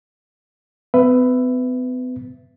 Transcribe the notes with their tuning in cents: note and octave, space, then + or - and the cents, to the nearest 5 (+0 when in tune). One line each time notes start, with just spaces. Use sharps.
B3 +45 B4 +15 E5 +15